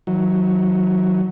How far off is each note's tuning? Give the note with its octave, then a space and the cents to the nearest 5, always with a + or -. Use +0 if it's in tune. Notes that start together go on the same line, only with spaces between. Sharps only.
D#3 +45 F#3 +0